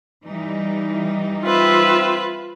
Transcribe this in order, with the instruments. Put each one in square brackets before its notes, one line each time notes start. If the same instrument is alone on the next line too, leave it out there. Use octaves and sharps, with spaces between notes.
[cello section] E3 G3 D#4
[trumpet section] C4 E5 [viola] F4 B4